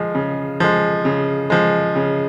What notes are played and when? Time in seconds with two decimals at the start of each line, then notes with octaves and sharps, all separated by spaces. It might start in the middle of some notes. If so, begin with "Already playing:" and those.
Already playing: F3 G#3
0.15 C#3
0.60 F3 G#3
1.05 C#3
1.50 F3 G#3
1.96 C#3